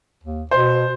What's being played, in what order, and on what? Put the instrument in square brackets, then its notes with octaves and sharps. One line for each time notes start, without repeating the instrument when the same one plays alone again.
[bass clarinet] D#2
[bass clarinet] B2 [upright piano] C5